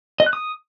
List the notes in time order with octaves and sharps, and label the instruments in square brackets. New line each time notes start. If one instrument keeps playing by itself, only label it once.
[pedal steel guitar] D#5
F#6
D#6